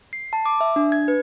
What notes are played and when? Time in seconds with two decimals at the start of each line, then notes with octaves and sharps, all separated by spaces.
0.13 C7
0.33 A5
0.46 D6
0.61 E5
0.76 D4
0.92 G#6
1.08 B4